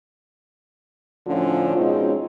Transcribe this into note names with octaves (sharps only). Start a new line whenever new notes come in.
D2 A2 D3 F3 C#4 F4
B2 G#3 C4 C#4 D#4 F4